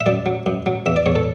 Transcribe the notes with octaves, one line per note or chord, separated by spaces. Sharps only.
E5
F#2 D5
F#3
F#2
F#3
E2 E5
D5
E2 C#5
A4